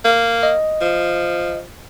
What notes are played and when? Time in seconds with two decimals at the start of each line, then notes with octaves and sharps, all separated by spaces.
0.05 A#3
0.43 D#5
0.81 F3